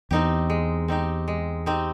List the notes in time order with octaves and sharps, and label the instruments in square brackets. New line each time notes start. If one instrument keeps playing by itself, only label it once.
[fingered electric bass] E2 [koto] C4 D#4 G4
[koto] G#3
C4 D#4 G4
G#3
C4 D#4 G4